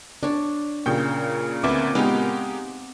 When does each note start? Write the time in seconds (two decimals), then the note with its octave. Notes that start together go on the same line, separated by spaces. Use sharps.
0.23 D4 C#5 D5
0.86 A#2 C#3 G5 G6
1.63 D2 C4 B4 E5 D6
1.95 G#3 B3 D#4 G4 F5